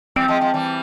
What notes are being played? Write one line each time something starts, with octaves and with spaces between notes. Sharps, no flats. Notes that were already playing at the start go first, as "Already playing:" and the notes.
E3 G3 C4
F3 G#3
F3 G#3
E3 G3